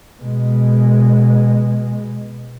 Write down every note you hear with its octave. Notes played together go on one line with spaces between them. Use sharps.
B2 G#3